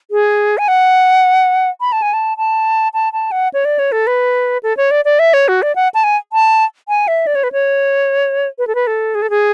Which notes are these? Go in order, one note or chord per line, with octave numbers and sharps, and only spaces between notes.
G#4
G#5
F#5
B5
A5
G#5
A5
A5
A5
A5
F#5
C#5
D5
C#5
A4
B4
A4
C#5
D5
D5
E5
C#5
F#4
D5
F#5
A5
G#5
A5
G#5
E5
D5
C#5
B4
C#5
B4
A4
B4
A4
G#4
A4
G#4